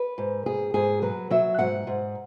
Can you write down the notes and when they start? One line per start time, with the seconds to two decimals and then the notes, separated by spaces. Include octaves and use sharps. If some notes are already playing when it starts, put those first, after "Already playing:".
Already playing: B4
0.18 G#2
0.46 G#2 G#4
0.74 G#2 G#4
1.02 F#3 B4
1.31 F#3 E5
1.59 G#2 F#5
1.87 G#2